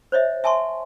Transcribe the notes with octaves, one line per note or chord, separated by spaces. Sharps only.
C5 C#5 D#5 E5
E5 G#5 A5 C6 C#6